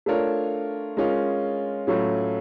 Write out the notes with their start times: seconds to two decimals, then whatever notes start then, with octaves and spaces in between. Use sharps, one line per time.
0.06 A3 D4 F4 A#4 C#5
0.97 G#3 C#4 F4 A#4
1.87 A2 F#3 A3 C#4 F4